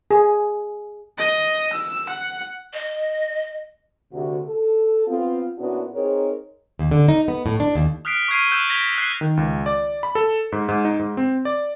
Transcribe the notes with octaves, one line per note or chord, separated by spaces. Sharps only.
G#4
D#5
E6
F#5
D#5
D2 C3 F#4
A4
B3 C4 F4
A#2 B3 C#4 D4 E4 F#4
C4 D#4 G#4 A#4 C#5
D#2
D3
D#4
B3
A2
D4
D#2
D#6 F6 F#6 B6 C7 D7
C#6 F6 F#6 G#6 C7 D#7
E6 F#6 G6 E7
G#6 A#6 B6 D7 F7 G7
F#6 C7
D#3
C#2
D5
B5
A4
G#2
G#2
D#4
G#2
C4
D5